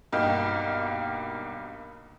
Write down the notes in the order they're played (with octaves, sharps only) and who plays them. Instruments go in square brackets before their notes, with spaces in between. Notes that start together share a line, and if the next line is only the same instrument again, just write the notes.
[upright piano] B1 G2 A#3 D#4 G5 F6